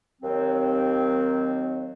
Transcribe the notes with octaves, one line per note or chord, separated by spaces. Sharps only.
D#2 F#3 C4